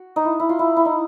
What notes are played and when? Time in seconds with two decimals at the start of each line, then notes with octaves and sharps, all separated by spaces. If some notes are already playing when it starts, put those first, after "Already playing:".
Already playing: F#4
0.16 D#4
0.25 E4
0.40 E4
0.49 F4
0.59 E4
0.77 E4
0.85 D#4